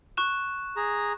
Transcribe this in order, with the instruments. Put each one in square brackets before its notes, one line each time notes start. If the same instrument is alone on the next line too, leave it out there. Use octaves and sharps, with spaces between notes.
[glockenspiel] C#6 F#6 E7
[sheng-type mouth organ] G#4 A#5